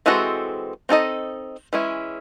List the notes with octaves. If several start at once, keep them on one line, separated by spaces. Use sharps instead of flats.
E3 G#3 C4 F#4 A4
C4 D#4 A4 D#5
E3 G#3 C#4 E4